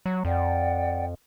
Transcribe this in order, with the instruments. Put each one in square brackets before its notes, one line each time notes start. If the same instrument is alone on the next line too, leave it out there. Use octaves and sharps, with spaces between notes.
[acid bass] F#3
[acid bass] F2 [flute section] D5 F#5 G5